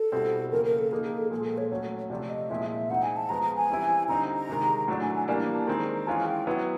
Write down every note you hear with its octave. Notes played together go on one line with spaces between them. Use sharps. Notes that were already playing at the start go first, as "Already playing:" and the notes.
Already playing: A4
B2 G3 C4 E4
C#3 F3 A#3 A#4
A#4
A4
F3 A#3 D#4 G#4
G#4
A4
A#2 F3 G#3 A4
A4
C#5
F#3 A3 C#4 C#5
C3 F3 A3 C4 D5
D#5
A#2 F3 G#3 C4 E4 E5
E5
F3 G#3 C4 D#4 F#5
G#5
A5
F3 G#3 B3 A#5
A#5
G#5
E3 G3 C4 E4
D3 G3 C4 D#4 A#5
A#5
C3 D#3 G#3
A2 F#3 A3 D4
G#5
G#5
E3 G3 A#3 D4 G#5
A#5
A5
D#3 G#3 C4 A#5
A#5
E3 G#3 C#4 F4 G#5
G5
F#3 B3 E4